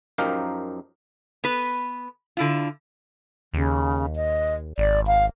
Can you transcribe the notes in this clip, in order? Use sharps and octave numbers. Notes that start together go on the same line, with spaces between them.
F#2 F3 D#4 G4 A#4 F5
B3 B4
D3 E4 F4
D#2 C#3
D#5
G#1 D5
F5